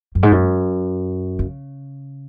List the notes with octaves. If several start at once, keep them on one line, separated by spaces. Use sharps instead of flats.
F#2
G#2
F#2
C#3